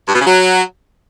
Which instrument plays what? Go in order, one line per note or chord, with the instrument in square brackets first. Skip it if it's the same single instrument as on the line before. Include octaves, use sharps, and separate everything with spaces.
[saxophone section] G2
B2
C#3
F#3